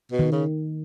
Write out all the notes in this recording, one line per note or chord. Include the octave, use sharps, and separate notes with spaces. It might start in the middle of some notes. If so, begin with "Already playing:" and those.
B2
D#3
C#3